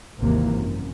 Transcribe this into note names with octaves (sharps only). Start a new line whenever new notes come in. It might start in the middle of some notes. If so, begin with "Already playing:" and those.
G#1 D#2 C3 E3 A#3
F#2